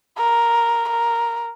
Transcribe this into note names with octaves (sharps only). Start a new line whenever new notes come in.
A#4
A#4